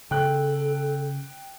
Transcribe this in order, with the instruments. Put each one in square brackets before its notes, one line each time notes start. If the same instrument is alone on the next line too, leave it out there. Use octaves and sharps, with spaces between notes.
[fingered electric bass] C#3 [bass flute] A4 [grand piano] G5 F#6